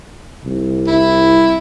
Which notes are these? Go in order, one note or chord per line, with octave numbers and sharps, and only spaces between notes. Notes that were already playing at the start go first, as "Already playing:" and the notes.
C2
E4